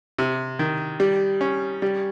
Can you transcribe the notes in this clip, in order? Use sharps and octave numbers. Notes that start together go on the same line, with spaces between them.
C3
D#3
G3
C#4
G3